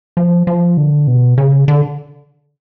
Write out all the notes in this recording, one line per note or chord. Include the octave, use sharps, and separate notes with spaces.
F3
F3
D3
B2
C#3
D3